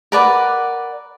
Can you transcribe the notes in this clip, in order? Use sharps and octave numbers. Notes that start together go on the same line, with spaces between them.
A#4 B4 D5 F#5